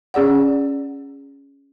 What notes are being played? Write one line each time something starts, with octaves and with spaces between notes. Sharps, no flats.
C#4 G#4 D5 F#5